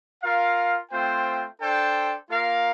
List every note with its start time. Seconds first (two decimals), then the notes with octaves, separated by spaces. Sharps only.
0.22 F4 A#4 F5
0.91 A3 C4 F4 C5 G5
1.60 D4 A4 C5 G5
2.29 A#3 F4 A#4 F5